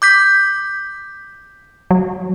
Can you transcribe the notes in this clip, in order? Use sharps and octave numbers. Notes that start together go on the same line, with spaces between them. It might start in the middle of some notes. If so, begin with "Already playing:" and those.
D6 G6 B6
F#3